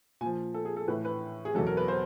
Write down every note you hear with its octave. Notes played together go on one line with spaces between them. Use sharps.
A#2 F3 G#5
A4
G#4
A4
A2 E3 B4
B4
G#4
E2 B2 F#3 A4
A#4
B4
C5